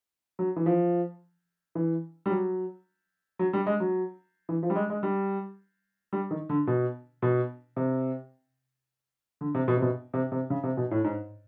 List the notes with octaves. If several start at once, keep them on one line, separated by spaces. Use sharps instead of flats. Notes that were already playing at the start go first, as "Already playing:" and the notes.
F#3
E3
F3
E3
G3
F#3
F#3
G3
G#3
F#3
E3
F3
G3
G#3
G#3
G3
G3
D#3
D3
B2
B2
C3
D3
C3
B2
C3
B2
C3
C3
C#3
C3
B2
A2
G#2